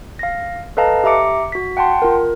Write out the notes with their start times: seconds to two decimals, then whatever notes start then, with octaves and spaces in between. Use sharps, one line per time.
0.19 F5 A#6
0.77 A4 B4 D#5 F5 A5 A#5
1.04 G4 E5 A#5 D6 C#7
1.52 F#4 B6
1.77 F#5 G5 A5 C6
2.02 F4 A#4